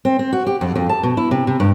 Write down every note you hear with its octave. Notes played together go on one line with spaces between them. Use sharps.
C4
C4
F#4
G4
F2
F2
A5
B2
E4
C3
C3
G2